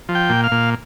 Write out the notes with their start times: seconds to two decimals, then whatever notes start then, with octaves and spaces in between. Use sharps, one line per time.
0.09 F3
0.15 G5
0.29 A#2
0.44 F5
0.51 A#2